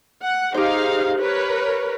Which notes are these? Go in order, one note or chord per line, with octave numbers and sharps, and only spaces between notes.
F#5
D#4 G4 G#4 C5 F5
A#4 B4 C#5